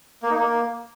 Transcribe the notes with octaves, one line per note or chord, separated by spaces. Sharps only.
A#3
D#4
A#3